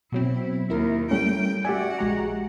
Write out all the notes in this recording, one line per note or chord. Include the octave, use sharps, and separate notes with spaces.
B2 F#3 C4 E4
D#2 E4 A#4
G3 A3 C#4 G5
F#4 G4 D5 E5 F#5 G#5
A#1 G#3 A#5